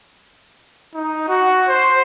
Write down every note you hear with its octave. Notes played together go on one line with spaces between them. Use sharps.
D#4
F#4
C5